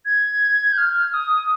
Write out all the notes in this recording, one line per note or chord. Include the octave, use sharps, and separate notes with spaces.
G#6
G6
F6
D#6